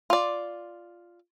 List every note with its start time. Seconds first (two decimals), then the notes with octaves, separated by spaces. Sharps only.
0.10 F4 D5